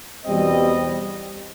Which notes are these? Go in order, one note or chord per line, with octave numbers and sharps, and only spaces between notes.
E2 B2 G3 C4 D#5